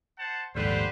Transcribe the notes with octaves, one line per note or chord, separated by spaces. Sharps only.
C5 F#5 A5
A#1 D#2 G#2 D3 G3 B4 C5